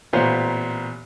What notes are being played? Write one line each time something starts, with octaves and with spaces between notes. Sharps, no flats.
A1 A#2 B3 C5 C#5 F5